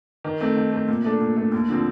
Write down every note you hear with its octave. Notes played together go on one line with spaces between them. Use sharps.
D#3
A3 C4
D#3
A3 C4
A#2
A3 D4 A4
A#2
A3 D4 A4
D#2
D3 F3 C4